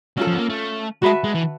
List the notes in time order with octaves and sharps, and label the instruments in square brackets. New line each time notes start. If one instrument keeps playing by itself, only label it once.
[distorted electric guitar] F#3 [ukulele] C#4 F4 A4
[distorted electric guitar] F3
B3
A#3
A3
[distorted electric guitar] G#3 [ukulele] F#4 B4 E5 A5
[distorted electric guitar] G#3
E3